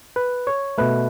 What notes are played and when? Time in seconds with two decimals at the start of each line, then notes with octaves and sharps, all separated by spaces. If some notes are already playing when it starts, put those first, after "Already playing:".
0.16 B4
0.47 C#5
0.78 B2 A3 B4